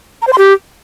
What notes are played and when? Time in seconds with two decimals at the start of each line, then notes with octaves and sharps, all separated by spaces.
0.22 A#5
0.27 C5
0.33 C6
0.38 G4